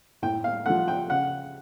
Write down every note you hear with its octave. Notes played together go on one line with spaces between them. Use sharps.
A2 G5
F5
F3 A3 F#5
G5
C#3 F#5